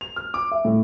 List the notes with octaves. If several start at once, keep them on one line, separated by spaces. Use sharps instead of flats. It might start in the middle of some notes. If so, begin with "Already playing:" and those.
F7
F6
D6
E5
A2